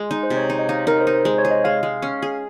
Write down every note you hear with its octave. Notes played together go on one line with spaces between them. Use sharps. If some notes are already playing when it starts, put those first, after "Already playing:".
Already playing: G#3
D#4
C5
C3
C#5
D#4 C5
D#5
D#4 F5
C#5
D#4 A#4
C5
D#4
C5
G#3 C5
C#5
G#4
D#5
G#3 F5
G#3
C#4
G#4